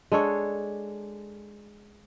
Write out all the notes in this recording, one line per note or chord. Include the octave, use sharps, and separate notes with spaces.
G#3 D4 A4 C#5